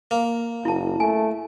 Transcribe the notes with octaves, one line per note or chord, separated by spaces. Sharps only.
A#3
F#1 E4 A5
A3 G#5